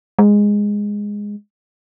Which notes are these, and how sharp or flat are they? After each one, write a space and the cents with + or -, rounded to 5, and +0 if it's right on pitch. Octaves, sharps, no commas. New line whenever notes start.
G#3 -10